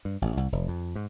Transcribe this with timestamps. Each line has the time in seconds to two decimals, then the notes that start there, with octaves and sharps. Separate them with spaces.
0.05 G2
0.22 A1
0.37 C2
0.52 F1
0.68 F2
0.96 G#2